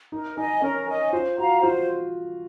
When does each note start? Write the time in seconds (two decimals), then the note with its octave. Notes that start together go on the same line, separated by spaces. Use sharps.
0.12 D#4 A#4
0.37 D#4 D#5 G#5
0.62 C#4 A#4
0.87 D#5 G#5
1.12 F4 C5
1.37 F#4 F5 A#5
1.63 F4 C5